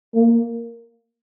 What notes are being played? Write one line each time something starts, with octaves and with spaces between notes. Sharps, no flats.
A#3